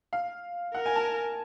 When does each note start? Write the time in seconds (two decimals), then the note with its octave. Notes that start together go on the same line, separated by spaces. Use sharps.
0.13 F5
0.75 A#4 F#5
0.86 G#5
0.96 A5